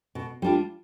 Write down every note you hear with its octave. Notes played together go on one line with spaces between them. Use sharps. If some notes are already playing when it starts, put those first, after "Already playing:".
B2
G3 D4 F4